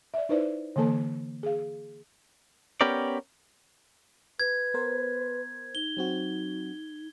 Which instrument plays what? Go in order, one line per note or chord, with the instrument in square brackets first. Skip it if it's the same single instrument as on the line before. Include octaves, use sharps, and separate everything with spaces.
[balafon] D5 E5
D#4 E4 B4 C5 D5
D3 E3 A#3 A4 A5
G#4 F5
[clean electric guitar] B3 C#4 G4 A#4 D5
[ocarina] B4 [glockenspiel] G#6
[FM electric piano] B3 A#4 C5
[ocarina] D#4 [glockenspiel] G7
[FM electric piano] F#3 C4 F#4